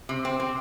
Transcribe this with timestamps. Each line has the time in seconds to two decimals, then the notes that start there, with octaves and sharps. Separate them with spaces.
0.09 C3
0.25 C4
0.40 C4